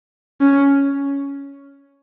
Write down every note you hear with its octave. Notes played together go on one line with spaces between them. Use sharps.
C#4